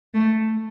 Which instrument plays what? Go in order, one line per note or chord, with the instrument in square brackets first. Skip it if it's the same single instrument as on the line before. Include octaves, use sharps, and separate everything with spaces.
[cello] A3